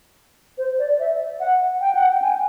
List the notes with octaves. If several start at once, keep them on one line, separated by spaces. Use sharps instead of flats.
C5
D5
E5
F#5
G5
F#5
G5
G#5